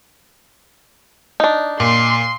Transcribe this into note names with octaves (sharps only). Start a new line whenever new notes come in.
D4 D#4
A#2 C6